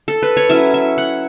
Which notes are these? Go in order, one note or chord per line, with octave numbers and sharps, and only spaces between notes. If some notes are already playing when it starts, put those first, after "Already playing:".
Already playing: F#4
A4
B4
C#5
F#3 C#4 E4 E5
E5
F#5